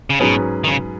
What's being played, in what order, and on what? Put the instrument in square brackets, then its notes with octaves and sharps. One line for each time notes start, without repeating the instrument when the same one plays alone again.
[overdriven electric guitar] C#3
[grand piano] G#2 F#3 C#4 G#4 B4 [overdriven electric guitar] B2
[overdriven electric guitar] D#3
C#3